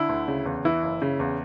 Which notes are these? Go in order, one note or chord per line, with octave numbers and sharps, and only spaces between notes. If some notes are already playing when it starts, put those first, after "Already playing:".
Already playing: D3 E4
D2
C#3
E2
E3 E4
F#1
C#3
E2